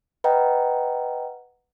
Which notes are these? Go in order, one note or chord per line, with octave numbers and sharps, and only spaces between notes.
B4 D#5 F#5 G5 A#5